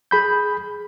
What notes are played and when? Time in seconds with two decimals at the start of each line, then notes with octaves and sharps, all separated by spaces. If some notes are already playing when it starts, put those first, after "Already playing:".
0.11 G#4 B5 G6